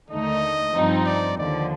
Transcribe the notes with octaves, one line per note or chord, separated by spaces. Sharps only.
D#2 D3 A3 D#4 D#5
G2 F3 C4 D#4
D5
D#2 D3 F3 D5